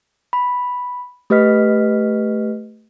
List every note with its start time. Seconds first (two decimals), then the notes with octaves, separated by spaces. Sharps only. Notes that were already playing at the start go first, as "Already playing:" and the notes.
0.33 B5
1.30 A3 G4 B4 D#5 F6 B6